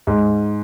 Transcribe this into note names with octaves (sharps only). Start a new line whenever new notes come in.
G#2